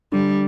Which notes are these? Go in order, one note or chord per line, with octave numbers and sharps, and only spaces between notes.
D3 G3